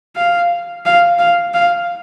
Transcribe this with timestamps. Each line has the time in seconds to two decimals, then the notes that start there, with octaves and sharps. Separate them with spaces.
0.16 F5
0.86 F5
1.19 F5
1.54 F5